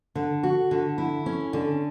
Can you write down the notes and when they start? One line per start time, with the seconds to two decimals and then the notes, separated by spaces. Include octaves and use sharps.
0.15 D3
0.43 F#4
0.71 D3
0.98 E4
1.26 C#4
1.53 D3